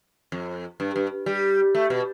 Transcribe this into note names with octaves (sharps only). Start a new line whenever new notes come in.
F2
G2
G2
G3
A3
B2